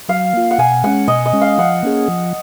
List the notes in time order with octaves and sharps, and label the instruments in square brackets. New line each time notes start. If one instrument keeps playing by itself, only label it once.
[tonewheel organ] F#3 [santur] F5
[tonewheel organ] A#3 F4
[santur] F#5
[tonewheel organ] B2 [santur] G#5
[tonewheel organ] G#3 C#4 [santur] F#5
[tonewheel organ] B2 [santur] D#5
[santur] D#5
[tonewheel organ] G#3 C#4
[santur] F5
[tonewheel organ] F3 [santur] F#5
[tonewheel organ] A#3 C#4 G#4
F3